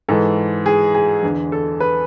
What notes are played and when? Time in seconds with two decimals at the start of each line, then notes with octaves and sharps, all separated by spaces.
0.08 G#2 E3 A4
0.66 G#4
0.94 G#4
1.23 E2 D3
1.52 A4
1.80 B4